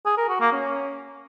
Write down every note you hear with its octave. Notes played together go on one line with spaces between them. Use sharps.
G#4
A#4
F#4
A#3
C#4